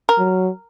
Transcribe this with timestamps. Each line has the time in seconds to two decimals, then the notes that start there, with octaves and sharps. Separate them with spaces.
0.09 A#4
0.18 F#3